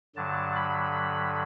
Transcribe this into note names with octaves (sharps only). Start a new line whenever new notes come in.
G2 D3 F#3 A5
B5